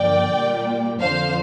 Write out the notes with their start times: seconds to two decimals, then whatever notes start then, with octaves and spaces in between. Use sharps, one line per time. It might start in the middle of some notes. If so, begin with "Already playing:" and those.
Already playing: G2 D3 F3 A#3 D5 G5
0.30 A#2 G3 A#3
1.00 F2 D3 F3 C5 F5